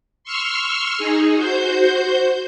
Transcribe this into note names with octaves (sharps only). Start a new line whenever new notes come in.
C6 C#6 E6 F6
D#4 G#4
F#4 C5 G6